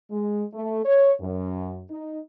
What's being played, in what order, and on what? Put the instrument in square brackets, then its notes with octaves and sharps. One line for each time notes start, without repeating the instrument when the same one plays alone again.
[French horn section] G#3
A3
C#5
F#2
D#4